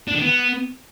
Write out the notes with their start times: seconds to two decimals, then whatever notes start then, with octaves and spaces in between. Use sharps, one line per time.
0.08 D4
0.15 D#3
0.22 B3